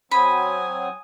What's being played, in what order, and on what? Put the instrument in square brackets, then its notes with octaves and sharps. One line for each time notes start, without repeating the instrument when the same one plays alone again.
[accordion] F#3 C4 [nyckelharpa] G#5 D#6 [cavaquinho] B5